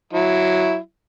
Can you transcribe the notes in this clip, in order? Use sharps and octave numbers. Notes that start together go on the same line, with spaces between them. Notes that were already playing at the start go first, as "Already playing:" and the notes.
F#3 E4